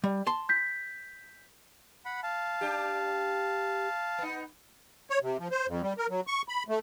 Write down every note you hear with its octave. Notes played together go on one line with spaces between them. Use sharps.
G3
A5 C6
G6 B6
F#5 B5
F5 A5
D4 G4
B3 D#4
C#5
C3
F3
C5
F2
G3
A#4
F#3
C#6
B5
A3